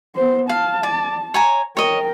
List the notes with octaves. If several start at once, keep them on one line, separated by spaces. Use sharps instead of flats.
B3 C5
F5 A5
D5
C#5 G#5 A#5
A#4 C#5 D#5 G5